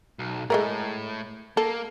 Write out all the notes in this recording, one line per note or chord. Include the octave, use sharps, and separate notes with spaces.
B1
A2 G#3 A3 A#4
A#3 A4